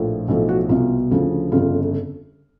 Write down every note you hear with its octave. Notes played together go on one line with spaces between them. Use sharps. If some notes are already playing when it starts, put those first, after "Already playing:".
Already playing: A#1 A2 F3
B1 A2 F3
F#4
C2 B2 F4
D2 C#3 F3
G1 F2 C#3 F4